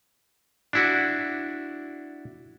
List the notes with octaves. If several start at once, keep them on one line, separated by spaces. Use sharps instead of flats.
D4 E4 F#4